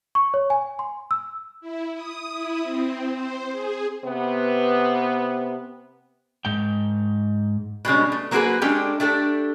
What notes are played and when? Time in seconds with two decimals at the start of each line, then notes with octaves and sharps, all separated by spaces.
0.15 C#6
0.34 C#5
0.50 G#5
0.79 C6
1.11 E6
1.61 E4
1.94 D#6
2.33 E4
2.63 C4
3.10 C5
3.51 G#4
4.05 C3 B3
6.45 G#2 G5
7.85 B2 G3 G#3 C#4
8.12 A3
8.31 F#3 A#3 C4 F#4 G#4 B4
8.62 G#3 C#4 D4 G4 A4 G5
9.00 A3 D4 G4 A4